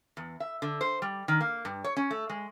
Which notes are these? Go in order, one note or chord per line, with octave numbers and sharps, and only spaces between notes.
E2
E5
D3
C5
G3
D#3
A#3
G2
C#5
C#4
A3
G#3